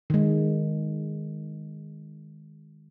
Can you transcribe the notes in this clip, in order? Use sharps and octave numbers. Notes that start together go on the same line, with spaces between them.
D#3 G#3